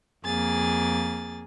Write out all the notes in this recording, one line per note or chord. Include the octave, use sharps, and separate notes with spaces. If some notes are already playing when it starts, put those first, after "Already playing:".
F2 A#3 G#4 A6